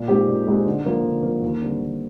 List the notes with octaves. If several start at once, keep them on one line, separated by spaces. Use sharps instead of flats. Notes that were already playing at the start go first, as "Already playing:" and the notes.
Already playing: A#2
G#3 C4 D#4 G4
A#2
G#3 C4 D#4 G4
D3
F3 A#3
D3
F3 A#3
D#2
D3 G3 C4
D#2